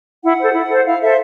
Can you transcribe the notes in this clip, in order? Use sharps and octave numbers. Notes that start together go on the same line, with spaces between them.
E4 F#5
A4 C5
E4
A4 C5
E4 F5
A4 C5 E5